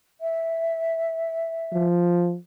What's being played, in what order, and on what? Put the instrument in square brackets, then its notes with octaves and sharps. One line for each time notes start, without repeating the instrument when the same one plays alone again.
[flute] E5
[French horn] F3